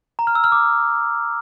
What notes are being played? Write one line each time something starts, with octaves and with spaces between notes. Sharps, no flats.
A#5
F6
E6
F6
D6